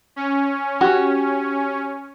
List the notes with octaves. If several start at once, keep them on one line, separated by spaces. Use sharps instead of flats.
C#4
F#4 G4